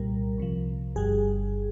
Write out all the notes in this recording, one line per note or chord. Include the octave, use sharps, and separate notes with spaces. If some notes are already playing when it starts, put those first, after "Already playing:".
Already playing: C2 A#2 G3 A#4
C2 C3 F3
G1 G2 G3 G#4